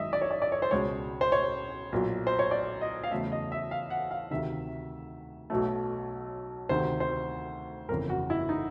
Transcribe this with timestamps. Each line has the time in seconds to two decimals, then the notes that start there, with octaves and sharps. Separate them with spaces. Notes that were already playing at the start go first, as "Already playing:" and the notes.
Already playing: G#1 F#2 D#3 G#3 D#5 E5
0.13 D5
0.22 C#5
0.31 D5
0.42 D5
0.52 C#5
0.62 C5
0.71 C#2 B2 G#3 C#5
1.21 C5
1.32 C#5
1.92 B1 A#2 F#3
2.27 C5
2.39 C#5
2.51 D5
2.81 D#5
3.04 F5
3.11 E2 C#3 F#3 A3 E5
3.32 D#5
3.52 E5
3.71 F5
3.90 F#5
4.11 F5
4.31 D2 C3 D#3 E5
5.50 B1 B2 F#3 A3
6.69 D2 C3 D#3 C5
7.00 C5
7.89 G1 F2 C#3 E3 A#4
8.10 F#4
8.30 E4
8.49 D#4